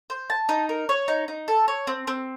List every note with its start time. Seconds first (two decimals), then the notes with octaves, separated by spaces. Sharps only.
0.10 C5
0.30 A5
0.49 D#4
0.69 A#4
0.89 C#5
1.08 D#4
1.28 D#4
1.48 A4
1.68 C#5
1.87 C4
2.07 C4